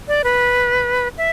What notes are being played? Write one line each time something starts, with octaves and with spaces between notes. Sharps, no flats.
D5
B4
E5